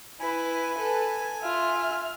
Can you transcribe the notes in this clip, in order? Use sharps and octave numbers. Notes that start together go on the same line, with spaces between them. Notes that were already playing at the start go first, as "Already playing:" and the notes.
E4 B4 G#5
A4 B4
F4 E5 F6